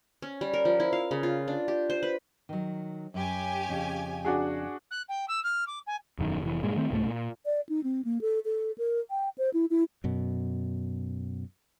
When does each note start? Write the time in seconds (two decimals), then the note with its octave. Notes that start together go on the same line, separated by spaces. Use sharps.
0.22 C#4
0.41 G3
0.53 A#4
0.65 F3
0.80 E4
0.93 F5
1.11 C#3
1.23 F4
1.48 D4
1.68 G4
1.90 C5
2.03 B4
2.49 D#3 F#3
3.14 F#2 C#4 G4 G#5
3.69 F2 C#3
4.25 D4 F#4 G#4
4.91 F#6
5.08 G5
5.28 E6
5.43 F6
5.67 D6
5.87 G#5
6.19 E1 F#2 D#3
6.42 F1 E3
6.63 G2 A#2 G#3
6.76 D#3 A3 C4
6.91 C2 G#2 F3 A3
7.06 A#2
7.45 D5
7.69 D#4
7.84 C4
8.05 A#3
8.21 A4
8.45 A4
8.78 A#4
9.10 G5
9.38 C5
9.54 E4
9.70 E4
10.04 F#2 B2